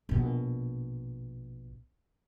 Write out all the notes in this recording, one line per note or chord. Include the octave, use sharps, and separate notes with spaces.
A#1 B2